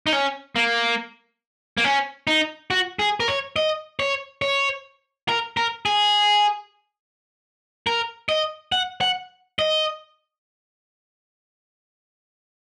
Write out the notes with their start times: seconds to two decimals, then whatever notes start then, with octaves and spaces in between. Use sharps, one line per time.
0.07 D#4
0.13 C#4
0.56 A#3
1.77 A#3
1.84 C#4
2.27 D#4
2.70 F#4
2.99 G#4
3.20 A#4
3.28 C#5
3.56 D#5
4.00 C#5
4.42 C#5
5.28 A#4
5.57 A#4
5.86 G#4
7.87 A#4
8.29 D#5
8.72 F#5
9.01 F#5
9.59 D#5